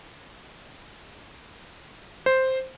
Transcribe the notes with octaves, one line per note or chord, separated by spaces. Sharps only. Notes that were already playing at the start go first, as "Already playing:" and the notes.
C5